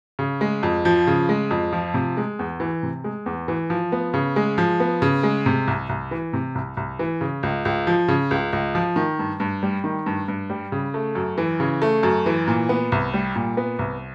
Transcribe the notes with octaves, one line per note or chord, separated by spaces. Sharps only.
C#3
G#3
F2
F3
C#3
G#3
F2
F3
C3
G#3
E2
E3
C3
G#3
E2
E3
F3
B3
C#3
G#3
F3
B3
C#3
G#3
C3
C2
C2
E3
C3
C2
C2
E3
C#3
C#2
C#2
F3
C#3
C#2
C#2
F3
D#3
G2
G2
G3
D#3
G2
G2
G3
C#3
A3
F#2
E3
C#3
A3
F#2
E3
A#2
B3
C2
G3
A#2
B3
C2